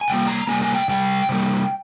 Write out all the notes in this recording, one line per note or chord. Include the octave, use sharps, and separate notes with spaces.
G#5
C3 G3 A#3 G5
A#5
C3 G3 A#3 G#5
G#5
G5
C3 G3 G5
C3 G3 A#3